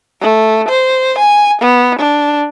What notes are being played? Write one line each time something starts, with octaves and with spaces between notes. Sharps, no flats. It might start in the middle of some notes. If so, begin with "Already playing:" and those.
A3
C5
G#5
B3
D4